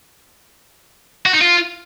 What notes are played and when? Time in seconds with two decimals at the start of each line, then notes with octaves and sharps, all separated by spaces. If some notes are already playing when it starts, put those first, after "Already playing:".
1.26 F#4
1.33 D#4
1.41 F4